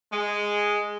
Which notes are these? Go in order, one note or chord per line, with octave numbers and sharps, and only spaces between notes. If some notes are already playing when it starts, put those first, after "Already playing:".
G#3